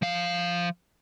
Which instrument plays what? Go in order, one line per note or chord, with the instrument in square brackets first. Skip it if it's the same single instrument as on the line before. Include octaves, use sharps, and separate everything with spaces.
[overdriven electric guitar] F3 F5